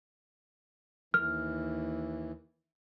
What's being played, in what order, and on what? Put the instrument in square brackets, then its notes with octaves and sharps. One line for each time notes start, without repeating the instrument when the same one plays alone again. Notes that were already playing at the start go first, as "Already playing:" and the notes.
[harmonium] D#2 E3 [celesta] F6